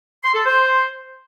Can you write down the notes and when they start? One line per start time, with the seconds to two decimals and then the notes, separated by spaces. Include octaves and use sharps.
0.23 C6
0.34 A4
0.45 C5